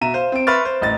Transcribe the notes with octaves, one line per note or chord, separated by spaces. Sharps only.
B2 E5 A#5 D#7 E7
C5 F5
C4 D7
B4 E5 C6 C#6 F6 A6
C5
A1 D#5 A6